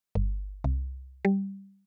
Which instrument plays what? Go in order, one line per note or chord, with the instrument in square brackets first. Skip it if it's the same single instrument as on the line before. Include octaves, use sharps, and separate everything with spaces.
[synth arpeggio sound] G1
C2
G3